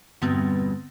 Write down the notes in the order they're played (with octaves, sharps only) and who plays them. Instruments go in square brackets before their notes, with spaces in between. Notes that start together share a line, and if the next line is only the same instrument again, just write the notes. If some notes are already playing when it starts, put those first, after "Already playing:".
[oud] E2 G2 B2 [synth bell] D3 B3 C4